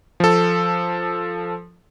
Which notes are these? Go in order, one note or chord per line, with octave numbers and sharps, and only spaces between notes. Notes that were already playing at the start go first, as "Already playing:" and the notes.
F3 A4